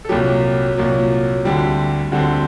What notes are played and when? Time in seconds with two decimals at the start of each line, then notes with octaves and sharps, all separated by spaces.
0.05 A4
0.09 C2 A#2 F#3 G4
0.77 C2 A#2 F#3
1.44 D2 D3 G3 C4
2.12 D2 D3 G3 C4 F#4